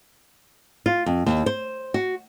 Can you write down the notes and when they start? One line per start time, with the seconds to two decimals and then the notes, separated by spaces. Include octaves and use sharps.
0.86 F4
1.06 F2
1.26 D#2
1.46 C5
1.94 F#4